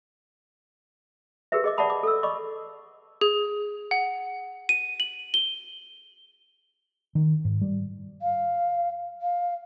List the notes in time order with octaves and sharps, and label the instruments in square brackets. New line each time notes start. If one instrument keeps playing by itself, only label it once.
[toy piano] G4 G#4 A#4 B4 E5
G#4 D#5 D6
D5 E5 F#5 A5 B5 D#6
D6
A4 E6
D5 D#5 B5 C#6 D6
[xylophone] G#4
F#5
D#7
F#7
G7
[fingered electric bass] D#3
G#2
G3
[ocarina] F5
F5